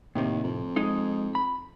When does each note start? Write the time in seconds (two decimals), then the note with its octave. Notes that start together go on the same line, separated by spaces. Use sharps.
0.15 D#2 A2 C3
0.44 F2
0.76 G#3 D#4
1.35 B5